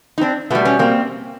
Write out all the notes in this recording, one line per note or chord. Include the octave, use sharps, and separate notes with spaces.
D#4
C4 D4
B2 G3 A3 B3
B3 C#4
A#3 C4